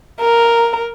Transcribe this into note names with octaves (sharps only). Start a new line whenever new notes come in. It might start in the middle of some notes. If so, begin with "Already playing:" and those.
A#4